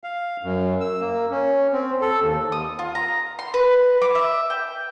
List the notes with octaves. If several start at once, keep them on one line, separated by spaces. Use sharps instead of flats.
F5
F#2
E6
A#3
C#4
C4
A4
D#2
D#6
F4
A#5
C6
B4
D6
E5
G5